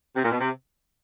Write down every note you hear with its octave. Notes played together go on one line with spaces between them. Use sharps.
C3
A#2
B2
C3